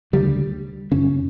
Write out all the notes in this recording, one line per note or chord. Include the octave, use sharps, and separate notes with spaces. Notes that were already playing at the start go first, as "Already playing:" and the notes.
D2 C#3 G3
F#2 C#3 C#4